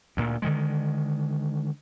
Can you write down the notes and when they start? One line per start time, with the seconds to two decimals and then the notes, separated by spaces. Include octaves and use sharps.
0.17 D2 A#2
0.42 D3 D#3 G#3